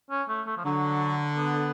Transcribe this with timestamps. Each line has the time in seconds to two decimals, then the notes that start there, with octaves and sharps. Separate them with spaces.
0.10 C#4
0.28 A3
0.46 A3
0.57 F3
0.65 D3 F#3
1.37 B3